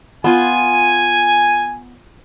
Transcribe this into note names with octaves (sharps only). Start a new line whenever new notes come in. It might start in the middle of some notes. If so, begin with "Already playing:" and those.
B3 F4 G#5